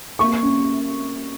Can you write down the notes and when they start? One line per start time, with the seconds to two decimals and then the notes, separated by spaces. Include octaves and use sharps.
0.19 A#3 C#6
0.43 C#4